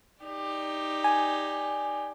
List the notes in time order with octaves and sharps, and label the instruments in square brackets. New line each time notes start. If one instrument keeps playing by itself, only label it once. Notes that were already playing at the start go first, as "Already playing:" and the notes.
[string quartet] D#4 G4 D5
[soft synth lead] G#5